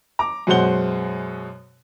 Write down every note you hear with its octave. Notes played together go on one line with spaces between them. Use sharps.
A#5 D6
F#2 B2 G#3 C5 F#5 G7